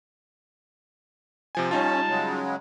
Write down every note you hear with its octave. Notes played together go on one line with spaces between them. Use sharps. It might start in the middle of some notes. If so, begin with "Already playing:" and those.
C3 F3 G#5
G3 C#4 D#4 F4 A5
C#3 F#3 G#3